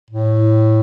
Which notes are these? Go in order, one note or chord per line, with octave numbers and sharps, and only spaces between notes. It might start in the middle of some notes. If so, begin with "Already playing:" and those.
A2